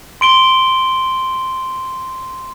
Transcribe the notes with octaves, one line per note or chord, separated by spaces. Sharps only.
C6 D7 G7